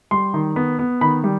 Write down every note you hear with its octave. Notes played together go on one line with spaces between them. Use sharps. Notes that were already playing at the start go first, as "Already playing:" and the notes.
G3 C6
D#3
B3
B3
D#3 B5
G3